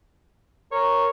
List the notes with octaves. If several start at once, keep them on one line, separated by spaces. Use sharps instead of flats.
A#4 C#5